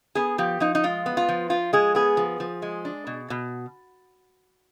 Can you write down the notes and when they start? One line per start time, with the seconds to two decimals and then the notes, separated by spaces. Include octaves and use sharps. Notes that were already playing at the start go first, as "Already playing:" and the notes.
0.15 B3 G#4
0.38 F3 G4
0.60 F3 D#4
0.75 D#4
0.84 G#3 F4
1.06 B3
1.17 F4
1.29 F3
1.50 F3 F4
1.73 G#3 G#4
1.95 B3 G#4
2.17 F3
2.40 F3
2.62 G#3
2.85 D4
3.07 B2
3.30 B2